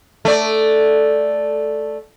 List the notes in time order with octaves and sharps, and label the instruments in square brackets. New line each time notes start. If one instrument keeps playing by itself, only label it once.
[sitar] A3 D5